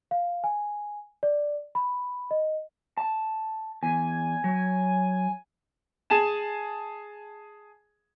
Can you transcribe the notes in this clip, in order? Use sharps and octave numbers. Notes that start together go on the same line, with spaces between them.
F5
G#5
D5
B5
D#5
A5
E2 G#5
F#3
G#4 G#5 A5 E7